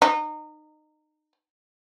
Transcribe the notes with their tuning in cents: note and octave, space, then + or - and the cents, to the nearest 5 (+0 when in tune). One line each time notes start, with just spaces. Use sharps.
D#4 -25